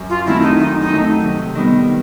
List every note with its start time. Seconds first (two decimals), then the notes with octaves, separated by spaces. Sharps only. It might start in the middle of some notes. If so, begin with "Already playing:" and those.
Already playing: F#2
0.09 F4
0.26 D#3 F#3 A3 C4 E4
0.42 D#4
0.59 F#2 D#4
0.81 D#4
0.92 D#3 F#3 A3 C4
1.24 C3
1.55 D#3 G3 B3 D#4